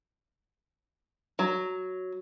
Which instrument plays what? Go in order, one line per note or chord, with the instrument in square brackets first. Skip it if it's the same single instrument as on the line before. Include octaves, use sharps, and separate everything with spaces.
[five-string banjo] F#3